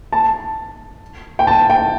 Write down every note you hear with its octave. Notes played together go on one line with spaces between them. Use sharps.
A5
G5
A5
G5